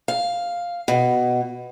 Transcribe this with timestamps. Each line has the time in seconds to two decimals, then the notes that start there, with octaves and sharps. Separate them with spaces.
0.08 F5
0.88 B2